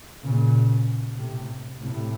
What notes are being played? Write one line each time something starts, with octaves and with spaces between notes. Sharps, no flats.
A#2 C#3
A2 C3
A2 C3